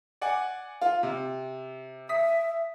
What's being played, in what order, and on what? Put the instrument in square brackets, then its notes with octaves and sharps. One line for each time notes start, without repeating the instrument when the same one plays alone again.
[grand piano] D5 F#5 G#5
F4
C3
[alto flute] E5 [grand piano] D#6 B6